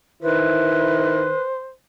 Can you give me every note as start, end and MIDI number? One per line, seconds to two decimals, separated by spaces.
0.23 1.35 51
0.23 1.27 64
0.23 1.41 71
0.23 1.72 72